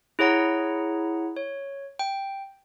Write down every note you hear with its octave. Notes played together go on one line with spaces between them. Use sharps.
E4 G#4 C#5 F#5 A#5
C#5
G5